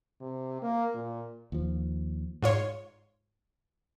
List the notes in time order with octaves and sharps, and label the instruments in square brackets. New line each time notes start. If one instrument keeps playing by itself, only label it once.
[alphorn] C3
A#3
A#2
[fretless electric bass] D#2 F3
[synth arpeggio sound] G#2 F4 C#5 C6